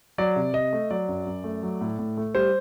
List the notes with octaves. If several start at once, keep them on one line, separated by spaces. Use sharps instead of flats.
F#3 D5
C3
C3 D#5
A3
F#3 D5
F#2
F#2
A3
F#3
A2
A2
A3
G3 C5